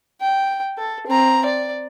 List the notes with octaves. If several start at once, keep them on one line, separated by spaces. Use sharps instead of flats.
G5
A4
C4 A#5
D5